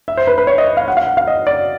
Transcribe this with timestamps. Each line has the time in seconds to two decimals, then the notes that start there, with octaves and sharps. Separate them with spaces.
0.08 E5
0.17 C5
0.27 B4
0.38 B4
0.47 C#5
0.58 D#5
0.77 F5
0.88 F#5
0.97 F5
1.07 F#5
1.17 F5
1.27 D#5
1.47 D5